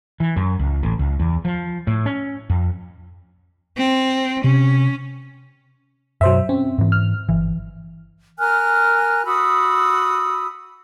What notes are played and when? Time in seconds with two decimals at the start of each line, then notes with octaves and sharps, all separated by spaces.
0.20 E3
0.36 F#2
0.59 C#2
0.83 A1
0.99 C#2
1.20 E2
1.45 F3
1.87 A2
2.06 C#4
2.50 F2
3.77 C4
4.44 C3 C#4
6.21 F#2 B2 F#3 C5 E5
6.49 C4 C#4
6.78 G#2 E3
6.92 F6
7.29 G1 E3
8.38 A#4 G#5 F6 F#6
9.25 F#4 B5 D#6 E6